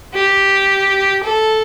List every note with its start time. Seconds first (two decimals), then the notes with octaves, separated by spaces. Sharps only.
0.14 G4
1.23 A4